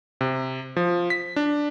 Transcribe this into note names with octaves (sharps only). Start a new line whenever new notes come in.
C3
F3
B6
D4